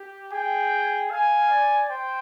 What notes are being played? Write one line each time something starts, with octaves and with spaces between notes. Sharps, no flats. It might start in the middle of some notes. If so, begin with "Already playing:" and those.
Already playing: G4
G#4 G5
F5 G#5
D5
C5 G5